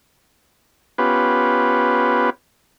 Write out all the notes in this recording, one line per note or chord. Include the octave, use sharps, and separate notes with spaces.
B3 C#4 F4 G4 B4